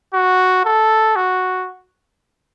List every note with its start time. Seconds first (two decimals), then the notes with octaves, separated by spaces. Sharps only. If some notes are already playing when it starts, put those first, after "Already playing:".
0.14 F#4
0.65 A4
1.16 F#4